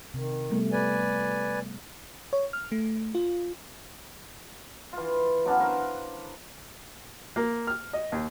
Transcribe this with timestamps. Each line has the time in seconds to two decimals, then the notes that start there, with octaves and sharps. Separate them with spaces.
0.14 C3 D#3
0.51 G3 A3 B3
0.72 B4 D5 G#5
2.33 C#5
2.53 F6
2.72 A3
3.15 F4
4.93 E3 F4
5.45 F#3 B3 C#4 D4
5.59 A#4 C5 F5
7.36 A#3
7.67 F6
7.93 D#5
8.12 D#2